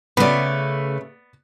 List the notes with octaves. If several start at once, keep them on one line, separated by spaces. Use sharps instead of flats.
C#3 A3 B3 B4 D5